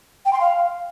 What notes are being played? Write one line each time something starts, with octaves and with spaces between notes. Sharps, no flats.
G5
C6
F5